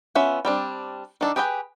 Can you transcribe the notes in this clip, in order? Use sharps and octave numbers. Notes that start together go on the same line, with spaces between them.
B3 C#4 F4 E5
G3 C4 D4
D#3 D4 A4
G4 G#4 B4 D5 G5